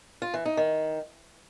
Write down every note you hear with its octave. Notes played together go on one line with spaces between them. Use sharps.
F4
E3
D#4
D#3